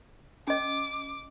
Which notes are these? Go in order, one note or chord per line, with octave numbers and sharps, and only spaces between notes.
C#4 D#5 D6